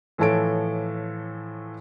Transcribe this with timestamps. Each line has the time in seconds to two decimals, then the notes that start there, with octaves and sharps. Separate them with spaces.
0.18 A2 E3 F3 A4 C#5 D7